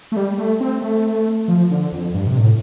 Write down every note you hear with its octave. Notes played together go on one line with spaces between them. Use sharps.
A3
G3
A3
C4
A3
F3
D3
F2
G2
C3
A2